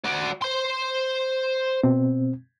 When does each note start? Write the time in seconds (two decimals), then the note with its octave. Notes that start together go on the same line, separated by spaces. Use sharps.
0.05 F#4 D5
0.42 C5 C6
1.83 B2 C4